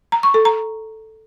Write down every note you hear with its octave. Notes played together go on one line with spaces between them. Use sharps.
A#5
C#6
A4
A#5